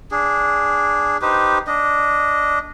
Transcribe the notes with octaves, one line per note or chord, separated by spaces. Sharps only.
D4 G#4
D#4 G4 B4 C5
D4 D#5